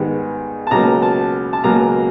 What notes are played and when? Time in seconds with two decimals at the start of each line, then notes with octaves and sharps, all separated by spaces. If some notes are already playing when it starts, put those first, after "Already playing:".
Already playing: G#2 D#3 G3 B3
0.67 A5
0.71 C#2 B2 F#3 A#3 A#5
1.02 A5
1.53 A5
1.64 C#2 B2 F#3 A#3 A#5